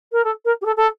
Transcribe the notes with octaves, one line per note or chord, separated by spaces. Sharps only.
A#4
A4
A#4
G4
A4
A4